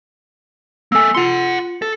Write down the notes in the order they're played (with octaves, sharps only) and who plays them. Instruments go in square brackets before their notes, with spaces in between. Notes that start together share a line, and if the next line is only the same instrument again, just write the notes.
[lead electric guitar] A#3 A4 [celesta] G#5 E6
[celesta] F4 C#7 [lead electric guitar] F#5 C6
[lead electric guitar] A4